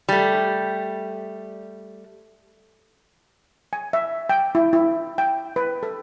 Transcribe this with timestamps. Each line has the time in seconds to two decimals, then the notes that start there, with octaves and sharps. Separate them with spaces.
0.09 G3 A3
3.73 G#5
3.93 E5
4.29 G5
4.55 E4
4.73 E4
5.18 G5
5.56 B4
5.83 A4